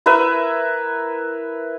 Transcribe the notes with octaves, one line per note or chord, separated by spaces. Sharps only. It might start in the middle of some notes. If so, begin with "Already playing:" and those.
E4 A#4 B4 E5